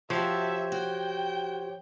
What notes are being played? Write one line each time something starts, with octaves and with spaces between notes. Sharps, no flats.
F3 F#4 G4 A4 C5 C#5 E5
F#4 G5